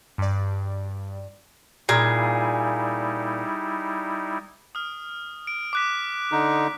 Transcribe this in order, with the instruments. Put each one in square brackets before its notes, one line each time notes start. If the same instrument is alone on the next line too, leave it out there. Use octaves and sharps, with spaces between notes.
[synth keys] G2 D5
[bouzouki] A#2 [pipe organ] G3 D#4 E4 [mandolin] G#4
[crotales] D#6 F6
D7
D6 F#6 B6
[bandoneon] D3 D#4